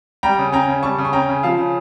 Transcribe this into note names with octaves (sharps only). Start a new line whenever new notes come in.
G3 G5 A#5
C#3
C#4 G5 A#5
C#3
G3 A5 C#6
C#3
C#6
C#4 G5 A#5
C#3
F3 F5 A5
C#3